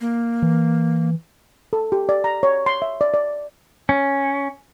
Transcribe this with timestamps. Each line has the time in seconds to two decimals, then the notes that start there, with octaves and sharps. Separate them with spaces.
0.01 A#3
0.43 E3
1.73 A4
1.92 G4
2.09 D5
2.24 A#5
2.43 C#5
2.66 C6
2.82 E5
3.01 D5
3.14 D5
3.89 C#4